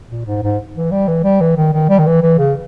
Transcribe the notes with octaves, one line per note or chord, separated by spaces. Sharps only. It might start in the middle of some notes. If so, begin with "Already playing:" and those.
A#2
G#2
G#2
E3
G3
E3
G3
E3
D#3
D#3
G3
D#3
E3
E3
C#3